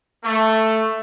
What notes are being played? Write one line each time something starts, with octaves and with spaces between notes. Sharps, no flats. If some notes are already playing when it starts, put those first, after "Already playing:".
A3